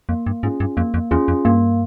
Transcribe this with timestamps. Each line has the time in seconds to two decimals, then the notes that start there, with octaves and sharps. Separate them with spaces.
0.09 F2 A#3
0.26 G2
0.43 G#2 C#4 F4 G#4
0.60 G2
0.77 F2 A#3
0.94 F2
1.11 E2 C#4 F4 G#4
1.28 F2
1.45 G2 A#3